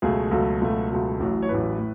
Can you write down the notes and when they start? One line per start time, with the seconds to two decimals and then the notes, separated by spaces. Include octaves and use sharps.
0.02 C#2 B2 F#3 A3 G#4
0.31 C#2 B2 F#3 A3 A4
0.61 C#2 B2 F#3 A3
0.91 C#2 B2 F#3 A3
1.20 A1 A2 F#3
1.43 C#5
1.49 A1 A2 F#3 B4
1.79 A2